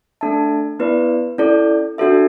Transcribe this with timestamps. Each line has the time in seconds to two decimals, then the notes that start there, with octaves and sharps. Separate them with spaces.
0.21 A3 D4 A4 E5 A5
0.79 B3 E4 B4 D5
1.38 C#4 E4 A4 D5
1.98 D4 F#4 A4 E5